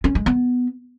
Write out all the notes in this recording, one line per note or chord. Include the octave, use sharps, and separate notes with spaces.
C#4
G#3
B3